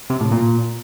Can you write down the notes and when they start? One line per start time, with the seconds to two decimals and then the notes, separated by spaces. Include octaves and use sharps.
0.10 C3
0.21 A2
0.32 A#2